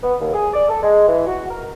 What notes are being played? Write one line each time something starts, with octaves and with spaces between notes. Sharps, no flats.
B3
D#2
G#4
D5
A4
G#3
E3
F#4
A#4